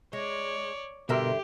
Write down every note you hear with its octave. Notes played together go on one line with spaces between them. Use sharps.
G#3 C#5 D5
G2 B2 D3 G4 A#4 E5 C6